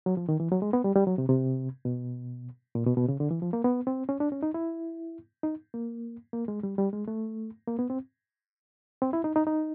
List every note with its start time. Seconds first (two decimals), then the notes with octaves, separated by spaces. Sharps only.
0.06 F#3
0.17 F3
0.29 D#3
0.40 E3
0.51 F#3
0.62 G#3
0.73 B3
0.84 G3
0.95 G3
1.07 F#3
1.18 C3
1.29 C3
1.85 B2
2.75 A#2
2.86 B2
2.97 B2
3.08 C#3
3.20 D3
3.31 E3
3.42 F3
3.53 A#3
3.64 B3
3.87 C4
4.09 C#4
4.20 D4
4.32 C#4
4.43 D#4
4.54 E4
5.43 D#4
5.74 A#3
6.33 A#3
6.48 G#3
6.63 G3
6.78 G3
6.93 G#3
7.08 A3
7.68 A#3
7.79 B3
7.90 C4
9.02 C4
9.13 E4
9.24 D#4
9.36 D#4
9.47 D#4